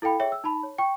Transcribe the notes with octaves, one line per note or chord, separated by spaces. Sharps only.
E4 A4 F5 G5 B5
G#4 C#5 E5 G5
E6
D#4 A5 B5
C#5
G5 C#6